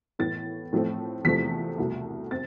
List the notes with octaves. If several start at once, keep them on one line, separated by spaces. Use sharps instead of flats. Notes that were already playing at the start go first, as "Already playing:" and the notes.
A2 E3 B3 A6
A2 F3 A3 C4
E2 C3 F3 A3 C4 B6
C2 B2 A3
C4 A6